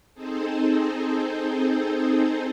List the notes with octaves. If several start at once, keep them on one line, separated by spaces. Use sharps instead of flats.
C4 D#4 G#4 A4 C5